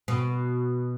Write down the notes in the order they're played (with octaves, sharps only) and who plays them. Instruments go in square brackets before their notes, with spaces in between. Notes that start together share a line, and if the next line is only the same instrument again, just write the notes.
[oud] B2 B3